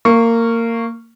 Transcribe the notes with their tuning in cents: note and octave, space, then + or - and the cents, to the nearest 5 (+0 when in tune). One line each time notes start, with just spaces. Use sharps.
A#3 -20 C#6 +0